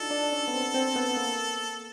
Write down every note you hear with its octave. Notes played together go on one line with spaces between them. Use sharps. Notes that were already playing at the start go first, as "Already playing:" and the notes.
Already playing: D4 D#4 F4 F#4 A4
D4
C#4
B3
C4
C4
B3
A#3